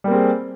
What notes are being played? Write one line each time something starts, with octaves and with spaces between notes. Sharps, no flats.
G3 A#3 C4 G#4